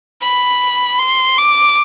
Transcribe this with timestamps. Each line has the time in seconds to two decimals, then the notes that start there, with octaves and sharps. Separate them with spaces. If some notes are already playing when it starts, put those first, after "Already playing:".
0.21 B5
0.99 C6
1.38 D6